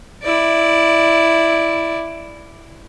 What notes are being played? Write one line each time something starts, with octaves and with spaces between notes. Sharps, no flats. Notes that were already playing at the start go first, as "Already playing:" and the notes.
E4 D5